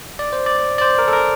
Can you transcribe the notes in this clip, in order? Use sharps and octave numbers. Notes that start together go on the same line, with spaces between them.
D5
C5
D5
D5
C5
A#4
A4
A#4